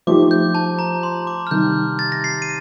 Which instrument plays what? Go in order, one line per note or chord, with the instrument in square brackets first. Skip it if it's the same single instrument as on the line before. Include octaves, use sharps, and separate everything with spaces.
[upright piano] F3 A3 D#4 G4 [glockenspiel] D6
[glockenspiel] G6
A5
A#5
C6
D6
F6
[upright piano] C3 D#3 G3 [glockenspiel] G6
[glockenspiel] A6
A#6
C7
D#7